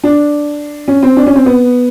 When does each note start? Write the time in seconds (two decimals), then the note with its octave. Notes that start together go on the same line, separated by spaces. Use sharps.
0.04 D4
0.88 C#4
1.03 C4
1.17 D4
1.27 C#4
1.36 C4
1.46 B3